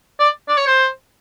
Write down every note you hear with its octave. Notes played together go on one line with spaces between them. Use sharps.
D5
D5
C#5
C5